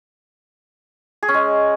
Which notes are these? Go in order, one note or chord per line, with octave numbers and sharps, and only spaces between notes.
G#4
C#4
G#3